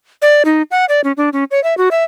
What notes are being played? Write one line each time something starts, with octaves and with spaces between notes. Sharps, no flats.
D5
D#4
F#5
D5
C#4
D4
C#4
C#5
E5
F#4
E5